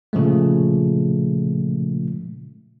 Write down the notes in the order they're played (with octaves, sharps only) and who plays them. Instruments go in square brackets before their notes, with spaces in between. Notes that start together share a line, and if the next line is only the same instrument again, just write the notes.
[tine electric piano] A#2 C#3 F3 G#3 A3